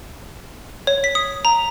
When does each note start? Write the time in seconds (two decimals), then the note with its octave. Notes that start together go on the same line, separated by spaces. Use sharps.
0.87 C#5
1.04 B6
1.15 D#6
1.45 A#5